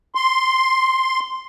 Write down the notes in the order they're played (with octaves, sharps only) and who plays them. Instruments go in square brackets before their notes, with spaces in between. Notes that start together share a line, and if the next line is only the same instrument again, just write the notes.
[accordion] C6